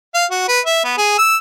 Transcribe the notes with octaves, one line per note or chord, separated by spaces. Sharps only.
F5
F#4
B4
E5
B3
G#4
E6